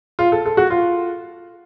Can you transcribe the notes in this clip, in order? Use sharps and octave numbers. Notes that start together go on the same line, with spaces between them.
F4
A4
A4
F#4
F4